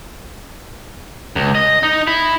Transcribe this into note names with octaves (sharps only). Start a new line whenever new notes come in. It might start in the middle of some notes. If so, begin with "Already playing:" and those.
C#2
D#5
D#4
E4